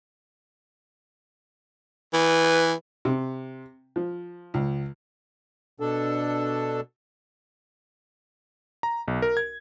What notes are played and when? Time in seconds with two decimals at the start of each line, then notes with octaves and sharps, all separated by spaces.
2.13 E3 B4
3.05 C3
3.96 F3
4.54 C#2
5.80 B2 D4 A4
8.83 A#5
9.08 B1
9.22 A#4
9.37 G#6